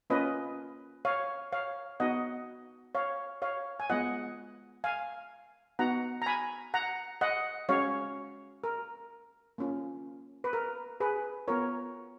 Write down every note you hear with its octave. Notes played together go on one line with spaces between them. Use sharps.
A#3 C#4 F4 B4 D#5
C#5 F5
C#5 F5
B3 D#4 F#4 D#5 F#5
C#5 F5
C#5 F5
G#5
G#3 B3 F4 D#5 F#5
F5 G#5
B3 D#4 F#4 F#5 A#5
A#5
G#5 B5
F#5 A#5
D#5 F#5
G#3 C#4 F#4 C#5 F5
A#4
A#3 C#4 F4
B4
A#4
G#4 B4
B3 F4 A#4 C#5